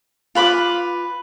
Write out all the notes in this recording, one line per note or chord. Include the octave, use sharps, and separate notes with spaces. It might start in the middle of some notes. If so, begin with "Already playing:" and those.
F4 B4 B5 D6